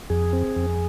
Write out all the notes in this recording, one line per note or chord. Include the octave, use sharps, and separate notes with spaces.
F2 G#4
C4
F2